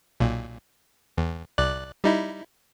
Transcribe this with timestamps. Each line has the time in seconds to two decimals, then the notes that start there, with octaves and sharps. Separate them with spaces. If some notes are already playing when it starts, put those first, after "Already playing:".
0.20 B1 A#2
1.18 E2
1.58 C2 D5 F#6
2.04 G3 D#4 E4